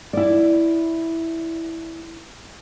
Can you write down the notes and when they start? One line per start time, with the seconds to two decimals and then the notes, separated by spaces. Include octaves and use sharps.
0.13 E4 D5